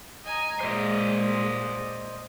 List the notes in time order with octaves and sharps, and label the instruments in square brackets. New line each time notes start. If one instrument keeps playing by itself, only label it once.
[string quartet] D#5 G#5 A#5
[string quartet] A#2 [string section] G#3 [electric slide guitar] C5 D5 D#5